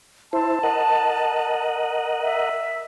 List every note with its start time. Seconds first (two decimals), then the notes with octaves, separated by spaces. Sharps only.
0.33 E4 C5 A5
0.63 A#4 D#5 F#5
2.22 E5